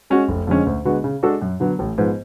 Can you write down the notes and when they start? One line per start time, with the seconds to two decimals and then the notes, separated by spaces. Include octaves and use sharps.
0.10 G#3 C#4 F#4
0.28 F1
0.47 F2 D3 G#3 C#4
0.66 D2
0.85 D3 G#3 B3 F#4
1.04 C#3
1.23 G#3 D4 F#4 A4
1.42 F#2
1.60 D3 F#3 B3
1.79 A1
1.98 G#2 F3 B3